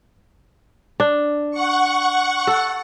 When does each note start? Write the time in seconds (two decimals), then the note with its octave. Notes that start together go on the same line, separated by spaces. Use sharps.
1.00 D4
1.51 F#5 C#6
2.47 A4